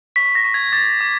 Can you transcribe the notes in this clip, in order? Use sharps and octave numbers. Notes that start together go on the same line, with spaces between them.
C#6 B6
A#6
C#6
G#6
D6 A6
D6